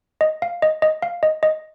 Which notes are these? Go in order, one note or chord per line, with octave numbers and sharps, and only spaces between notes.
D#5
F5
D#5
D#5
F5
D#5
D#5